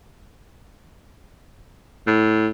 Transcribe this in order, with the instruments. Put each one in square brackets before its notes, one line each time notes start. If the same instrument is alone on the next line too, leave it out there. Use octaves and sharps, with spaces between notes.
[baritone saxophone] A2